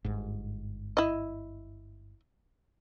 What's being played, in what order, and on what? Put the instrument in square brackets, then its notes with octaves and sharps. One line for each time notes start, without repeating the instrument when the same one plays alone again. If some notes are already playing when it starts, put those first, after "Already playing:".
[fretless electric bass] G1 G#2
[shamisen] E4 D#5